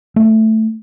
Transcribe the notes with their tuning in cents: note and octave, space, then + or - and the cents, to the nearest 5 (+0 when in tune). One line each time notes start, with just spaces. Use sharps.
A3 +5